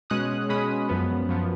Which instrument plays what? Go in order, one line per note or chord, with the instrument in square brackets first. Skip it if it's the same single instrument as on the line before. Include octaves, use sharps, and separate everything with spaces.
[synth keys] B2 G#3 C#4 D#6 F#6
B2 G#3 C#4 B5 D#6
F#2 F3 B3
F#2 F3 B3